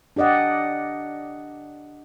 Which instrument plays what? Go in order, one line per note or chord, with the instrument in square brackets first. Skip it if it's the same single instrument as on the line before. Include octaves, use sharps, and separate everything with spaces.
[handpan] D4 G4 D5 D#5 F#5